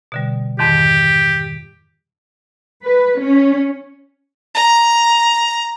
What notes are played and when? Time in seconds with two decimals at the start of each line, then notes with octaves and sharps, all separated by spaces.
0.12 B2 D3 G3
0.59 F2 G#2 D#3 G4
2.83 B4
3.20 C#4
4.55 A#5